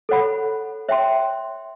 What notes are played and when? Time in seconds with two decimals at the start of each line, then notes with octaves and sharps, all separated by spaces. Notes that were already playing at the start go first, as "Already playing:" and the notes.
0.09 A4 C#5 F#5 B5
0.89 C#5 E5 G5 C6